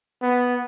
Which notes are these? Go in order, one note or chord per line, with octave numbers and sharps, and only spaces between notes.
B3